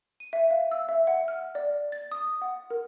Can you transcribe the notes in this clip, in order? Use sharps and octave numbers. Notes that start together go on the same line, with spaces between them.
D#7
E5
F5
E6
E5
F#5
F6
D5
A6
D#6
F#5
A#4